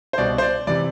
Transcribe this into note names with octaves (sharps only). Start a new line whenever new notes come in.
C5
C2 B2 D5
C5
D5
C3 E3 D5